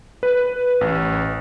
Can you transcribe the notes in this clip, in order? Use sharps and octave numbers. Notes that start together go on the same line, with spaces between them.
B4
A1